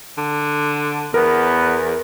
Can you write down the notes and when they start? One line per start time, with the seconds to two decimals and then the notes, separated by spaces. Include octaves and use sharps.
0.18 D3
1.14 E2 B3 A#4